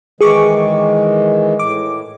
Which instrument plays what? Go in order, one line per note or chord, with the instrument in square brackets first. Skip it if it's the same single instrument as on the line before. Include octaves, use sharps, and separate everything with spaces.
[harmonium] D#3 E3 G#3 [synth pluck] G#4 C#6 D6
[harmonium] A2 [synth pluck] D6